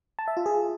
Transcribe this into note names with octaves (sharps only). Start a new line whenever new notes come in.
A5
E5
F4
G#4